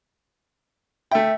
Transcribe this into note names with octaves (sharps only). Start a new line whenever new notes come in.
A3 E5 G5